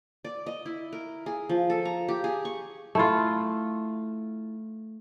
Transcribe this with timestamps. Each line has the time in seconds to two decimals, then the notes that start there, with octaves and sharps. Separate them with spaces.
0.25 D5
0.46 D#5
0.66 E4
0.93 A#4
1.26 G#4
1.49 F3
1.70 A4
1.85 A#5
2.08 G4
2.24 G#4
2.45 C#6
2.95 A3 E4 F4